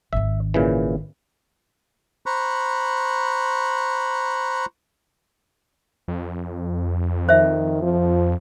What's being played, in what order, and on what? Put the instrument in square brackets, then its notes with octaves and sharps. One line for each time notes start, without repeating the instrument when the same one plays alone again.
[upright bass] G#1 D#3 [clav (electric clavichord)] E5
[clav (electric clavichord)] A#2 C#3 E3
[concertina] C5 A#5 B5 C#6 F#6
[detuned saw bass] F2
[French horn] D#3 [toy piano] C5 E5
[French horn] F3